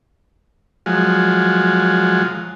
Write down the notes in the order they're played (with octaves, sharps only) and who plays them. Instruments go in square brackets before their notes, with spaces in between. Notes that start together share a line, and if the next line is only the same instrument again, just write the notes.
[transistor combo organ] F3 F#3 G#3